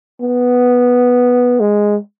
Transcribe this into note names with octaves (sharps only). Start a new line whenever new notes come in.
B3
G#3